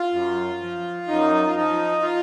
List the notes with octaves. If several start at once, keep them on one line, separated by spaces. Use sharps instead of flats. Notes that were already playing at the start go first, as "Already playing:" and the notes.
Already playing: F4
F#2
F3
F#2 D#4
F4
F3 D#4
F4